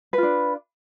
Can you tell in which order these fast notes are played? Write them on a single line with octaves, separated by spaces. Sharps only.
B4 F4 D4